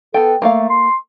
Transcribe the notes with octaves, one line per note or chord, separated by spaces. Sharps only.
B3 A4 G5
A3 A#3 A4 F5
C6